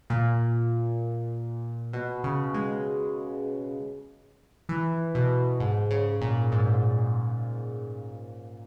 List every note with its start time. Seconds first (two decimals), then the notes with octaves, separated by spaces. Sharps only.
0.10 A#2
1.93 B2
2.24 C#3
2.54 G#3
4.69 E3
5.15 B2
5.60 G#2
5.91 C#3
6.21 A#2
6.52 G#2